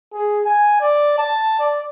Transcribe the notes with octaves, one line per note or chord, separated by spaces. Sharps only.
G#4
G#5
D5
A5
D5